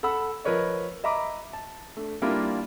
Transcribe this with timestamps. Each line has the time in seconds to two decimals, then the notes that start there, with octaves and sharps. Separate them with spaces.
0.03 A4 F#5 B5 E6
0.45 F3 A#4 B4 C#5 D#5
1.04 D#5 E5 A#5 B5 D6
1.53 A5
1.97 A3 D4
2.22 G3 A#3 D4 E4 F4 A#4